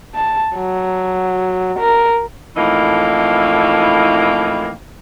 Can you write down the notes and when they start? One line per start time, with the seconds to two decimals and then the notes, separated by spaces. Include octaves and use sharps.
0.15 A5
0.55 F#3
1.79 A#4
2.57 F2 A2 E3 A#3 D#4